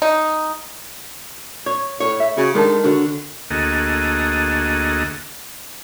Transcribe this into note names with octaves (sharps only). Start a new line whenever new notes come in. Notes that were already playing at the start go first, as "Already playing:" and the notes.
D#4
C#5
A2 C#5
E5
C#3 F#4 C#5
D#3 G#3 D4 A4
D3 F#4 A#4 C#5
D2 A#3 F#4 G#4 A4 D#5